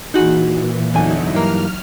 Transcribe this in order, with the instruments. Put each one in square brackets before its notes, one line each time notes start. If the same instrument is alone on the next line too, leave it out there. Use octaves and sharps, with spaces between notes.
[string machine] A#2 E3 [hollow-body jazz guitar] D#4 F#4 G#4
[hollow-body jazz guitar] E2 D3 G#5 [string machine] F#3 D#4 E4
[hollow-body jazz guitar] G2 E3 A#3 [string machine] F6